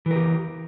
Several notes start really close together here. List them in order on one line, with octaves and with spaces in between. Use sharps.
E3 A#4 G4